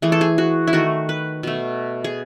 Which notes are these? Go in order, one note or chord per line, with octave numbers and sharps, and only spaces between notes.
E3 A3 G#4
A4
G#4
F#4
E4
D#3 A3 F#4
B4
B2 A3
G#4